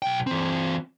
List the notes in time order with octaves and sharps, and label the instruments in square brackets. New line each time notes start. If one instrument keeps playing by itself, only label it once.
[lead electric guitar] B1 G5
E3 C4